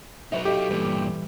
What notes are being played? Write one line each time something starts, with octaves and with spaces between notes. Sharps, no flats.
F#3 D#4 B4 D5 E5
G4 A4 D#5 F5
G2 A#2 E3 G3